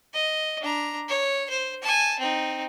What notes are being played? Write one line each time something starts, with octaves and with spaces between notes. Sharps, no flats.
D#5
D4 A#5
C#5
C5
G#5 A5
C4 D#4